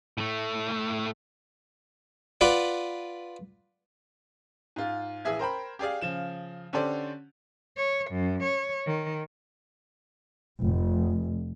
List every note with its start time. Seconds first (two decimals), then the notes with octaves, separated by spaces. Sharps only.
0.18 A2 A3
2.41 F4 B4 D5 F#5
4.76 G#2 F4
5.25 A#1 E3 G#4 E5 G#6
5.39 A#4 C5 G5 B5
5.79 G4 G#4 D5 F5
6.01 C#3 F3 E7
6.73 D3 C#4 G4 A4 C5 D5
7.77 C#5
8.11 F#2
8.44 C#5
8.86 D#3
10.62 F1